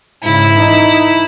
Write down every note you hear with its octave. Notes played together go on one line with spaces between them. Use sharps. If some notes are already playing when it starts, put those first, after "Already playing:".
G#2 C#3 E4
E3 D#4